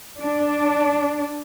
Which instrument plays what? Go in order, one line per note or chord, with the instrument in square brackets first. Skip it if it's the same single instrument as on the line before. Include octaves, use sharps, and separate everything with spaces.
[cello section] D4